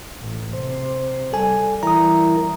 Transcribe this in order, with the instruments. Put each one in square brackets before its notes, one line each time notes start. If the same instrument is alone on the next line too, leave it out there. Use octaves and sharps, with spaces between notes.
[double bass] A1
[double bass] C3 [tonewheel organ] C5
[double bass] G3 [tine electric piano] A4 G#5
[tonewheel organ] E3 E4 A#4 [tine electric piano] A#5 D#6